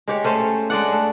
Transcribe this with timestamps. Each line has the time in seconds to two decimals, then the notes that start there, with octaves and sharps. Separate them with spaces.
0.08 G#3 G4 C#5
0.24 A3 C#4 C5
0.70 G#3 D4 D5 F#5
0.92 A3